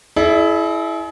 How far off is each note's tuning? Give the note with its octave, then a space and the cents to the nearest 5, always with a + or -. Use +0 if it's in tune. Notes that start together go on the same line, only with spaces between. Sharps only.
E4 +0 G#4 +40 D5 +45